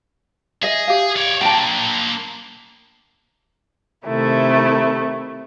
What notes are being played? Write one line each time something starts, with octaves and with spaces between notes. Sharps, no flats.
G#4 D#5 E5
G4 F5
C#5 D5
A#3 D4 G5 A5
C3 D#3 A3 E4